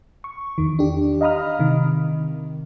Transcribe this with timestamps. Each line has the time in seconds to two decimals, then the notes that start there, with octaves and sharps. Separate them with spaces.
0.24 C#6
0.58 E2 D#3
0.79 D4 G4
1.21 D#5 F5 A#5 B5 D#6 F6
1.59 C3 D#3